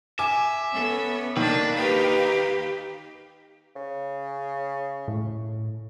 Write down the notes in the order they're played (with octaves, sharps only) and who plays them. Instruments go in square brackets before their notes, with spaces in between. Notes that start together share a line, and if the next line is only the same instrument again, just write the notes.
[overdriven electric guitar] E5 [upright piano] G#5 D6
[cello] B3 C#4 [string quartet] A4
[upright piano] D#3 [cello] A#3 D4 [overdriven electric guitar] B4
[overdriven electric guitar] D#2 [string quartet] D#4 B4 F5 [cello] G4
[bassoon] C#3
[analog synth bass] A2